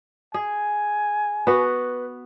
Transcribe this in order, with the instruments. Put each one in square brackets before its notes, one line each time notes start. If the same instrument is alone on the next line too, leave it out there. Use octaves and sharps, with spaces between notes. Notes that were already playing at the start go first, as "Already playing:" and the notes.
[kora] G#4 [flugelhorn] G#5
[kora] B3 F#4 [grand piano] B4